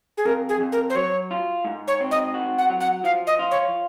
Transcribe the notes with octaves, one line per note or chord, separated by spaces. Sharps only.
G#4
F2 A#4
G#4
F2
A#4
C5
F#3 C#5
F4
G#2
C#5
C4
D#5
F#4
F#5
F#3
F#5
F3 F5
D#5
F4
C#5